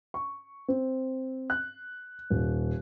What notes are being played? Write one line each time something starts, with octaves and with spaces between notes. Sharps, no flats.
C#6
C4
F#6
D#1